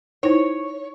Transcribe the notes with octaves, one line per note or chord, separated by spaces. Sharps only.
D#4 E4 C5 C#5